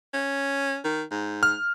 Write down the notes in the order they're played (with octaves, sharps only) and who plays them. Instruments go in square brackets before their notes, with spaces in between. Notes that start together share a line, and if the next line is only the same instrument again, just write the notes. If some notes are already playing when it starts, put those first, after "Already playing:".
[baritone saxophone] C#4
D#3
G#2
[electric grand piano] F6